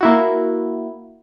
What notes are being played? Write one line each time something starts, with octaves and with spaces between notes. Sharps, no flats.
A#3 E4 F#4